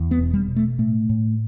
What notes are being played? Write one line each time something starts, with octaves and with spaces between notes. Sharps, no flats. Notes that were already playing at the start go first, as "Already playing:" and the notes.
Already playing: E2
B3
E1
G3
B2
A3
A2 A3
A2